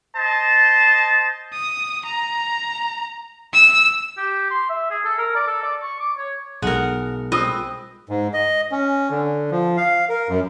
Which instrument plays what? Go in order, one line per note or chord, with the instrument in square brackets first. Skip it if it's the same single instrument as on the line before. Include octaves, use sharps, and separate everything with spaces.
[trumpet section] C5 D#5 A5
[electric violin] D#6
A#5
E6
[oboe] G4
C6
E5
G#4
A4
A#4
D5
A4
D5
C#6
D6
C#5
[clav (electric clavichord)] B1 [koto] G#3 A#4 [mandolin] F#5
[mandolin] C4 B4 [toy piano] F4 D#6 E6 [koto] D#5
[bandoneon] G#2
D#5
C#4
D3
F3
F5
A#4
F#2